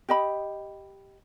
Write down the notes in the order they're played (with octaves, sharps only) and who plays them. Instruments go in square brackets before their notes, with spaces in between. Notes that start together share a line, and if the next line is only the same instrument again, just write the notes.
[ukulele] G4 D#5 B5